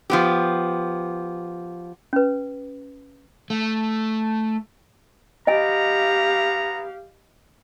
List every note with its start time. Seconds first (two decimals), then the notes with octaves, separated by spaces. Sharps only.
0.10 F3 B3 G4
2.13 C#4 B4
3.50 A3
5.47 B3 G4 D#5 F5 G#5 A#5